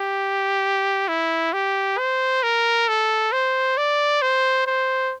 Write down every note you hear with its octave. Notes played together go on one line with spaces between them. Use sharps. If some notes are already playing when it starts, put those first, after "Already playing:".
Already playing: G4
E4
G4
C5
A#4
A4
C5
D5
C5
C5